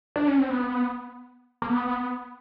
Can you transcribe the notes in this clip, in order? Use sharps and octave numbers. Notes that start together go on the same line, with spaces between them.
D4
C#4
C4
B3
A#3
B3